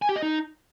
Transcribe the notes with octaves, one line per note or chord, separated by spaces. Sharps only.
G#5
G4
D#5
D#4